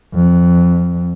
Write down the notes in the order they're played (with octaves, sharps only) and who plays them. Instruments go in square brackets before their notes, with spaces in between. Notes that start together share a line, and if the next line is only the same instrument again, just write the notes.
[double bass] F2